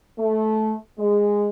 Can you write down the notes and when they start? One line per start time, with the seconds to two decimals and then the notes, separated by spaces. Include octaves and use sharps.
0.19 A3
0.98 G#3